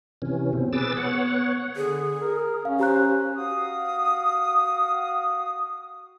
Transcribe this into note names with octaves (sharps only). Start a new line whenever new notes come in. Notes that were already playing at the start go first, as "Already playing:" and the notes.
C3 E3 C#4
B2 C4
G#4 B4 D6 E6 A6
B3 C#5 F#5
D3 G#4
A#4
C#4 F5
G4 C5 A#5 F#6
F#4 F5 D#6